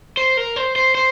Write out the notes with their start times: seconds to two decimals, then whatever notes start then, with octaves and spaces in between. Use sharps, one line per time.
0.17 C5
0.37 A#4
0.56 C5
0.76 C5
0.95 C5